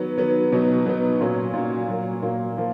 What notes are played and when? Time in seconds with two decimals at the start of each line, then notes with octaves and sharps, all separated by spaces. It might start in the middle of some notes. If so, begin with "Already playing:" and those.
Already playing: D#3 F#3 B3
0.17 D#3 F#3 B3
0.52 B2 F#3 B3 D#4
0.85 B2 F#3 B3 D#4
1.20 A#2 F#3 C#4
1.53 A#2 F#3 C#4
1.88 A#2 F#3 A#3
2.22 A#2 F#3 A#3
2.57 F3 A#3